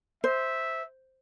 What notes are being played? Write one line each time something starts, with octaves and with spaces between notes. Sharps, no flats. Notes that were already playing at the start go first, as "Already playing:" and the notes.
C5 E5